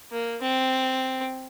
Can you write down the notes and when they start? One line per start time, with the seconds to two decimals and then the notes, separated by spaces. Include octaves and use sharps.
0.11 A#3
0.42 C4